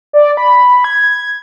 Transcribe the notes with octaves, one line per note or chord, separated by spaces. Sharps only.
D5
B5
G#6